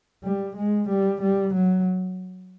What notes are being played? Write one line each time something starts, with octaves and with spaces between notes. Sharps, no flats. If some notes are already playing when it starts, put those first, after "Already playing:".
G3
G#3
G3
G3
F#3